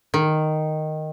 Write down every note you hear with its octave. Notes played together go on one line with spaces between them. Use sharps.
D#3